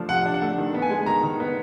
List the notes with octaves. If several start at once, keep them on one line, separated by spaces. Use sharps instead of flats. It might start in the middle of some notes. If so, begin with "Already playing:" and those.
Already playing: F3 A3 D4
C3 F#5
D4
F#5
A3
D#3
B3
G#5
G#3
D#3 A#5
D#3
B3